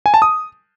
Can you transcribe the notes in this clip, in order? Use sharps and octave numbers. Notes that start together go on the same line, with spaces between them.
G#5
A5
D#6